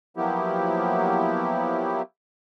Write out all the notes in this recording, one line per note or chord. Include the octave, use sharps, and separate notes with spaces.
F3 F#3 A#3 B3 E4 G4